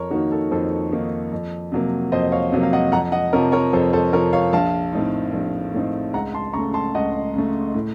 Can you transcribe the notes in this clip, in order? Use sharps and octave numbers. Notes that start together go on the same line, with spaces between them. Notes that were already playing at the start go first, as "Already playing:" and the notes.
Already playing: F2 A#4 C#5
D#3 A#3 D#4 F#4
A4
F2 A4 C5
D#3 A#3 D#4
F2
C3 F#3 A#3
F2 C5 D#5
C#5 F5
C3 F#3 A#3
F5
D#5 F#5
F2 F#5 A#5
D#5 F#5
C3 F3 A#4 C#5
A#4 C#5
F2 A4 C5
A4 C5
C3 F3 A#4 C#5
C#5 F5
A#1 F5 A5
A2 A3 C4 D#4
A#1
A2 A3 C4 D#4
C#2 F#5 A#5
A5 C6
C#3 A3 A#5 C#6
A5 C6
C#2 D#5 F#5
C#3 A3
A2